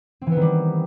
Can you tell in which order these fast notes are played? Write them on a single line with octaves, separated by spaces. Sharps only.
C4 E3 B3 D#3 G3